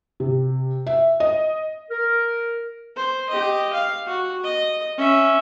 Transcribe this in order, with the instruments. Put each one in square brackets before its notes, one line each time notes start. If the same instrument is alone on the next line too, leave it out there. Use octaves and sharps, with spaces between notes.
[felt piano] C3
E5
D#5
[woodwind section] A#4
[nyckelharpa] C5
G4 D#5
F5
F#4
D#5
C#4 E5